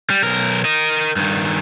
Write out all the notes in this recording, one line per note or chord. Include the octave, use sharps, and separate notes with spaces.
G3
B1 A#4
A#4 D#5
G2 D#3